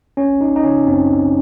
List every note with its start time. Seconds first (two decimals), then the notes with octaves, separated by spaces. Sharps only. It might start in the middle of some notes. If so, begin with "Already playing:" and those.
0.17 G#1 C#4
0.41 G#1 D#4
0.56 D#4
0.64 C#3 C#4
0.87 F#2 C4
1.10 G#1